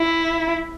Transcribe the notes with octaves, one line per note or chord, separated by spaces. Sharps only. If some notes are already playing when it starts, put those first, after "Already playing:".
Already playing: E4